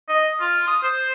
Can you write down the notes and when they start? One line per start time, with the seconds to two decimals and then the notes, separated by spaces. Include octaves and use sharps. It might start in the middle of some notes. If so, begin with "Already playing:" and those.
0.09 D#5
0.40 F4
0.68 D#6
0.83 C5